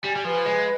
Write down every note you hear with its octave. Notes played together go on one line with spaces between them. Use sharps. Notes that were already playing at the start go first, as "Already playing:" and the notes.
G3 G#5
G3
F3 B4
G#3 F5